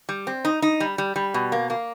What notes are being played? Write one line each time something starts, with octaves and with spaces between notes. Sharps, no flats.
G3
C4
D#4
D#4
G3
G3
G3
B2
A#3
A#3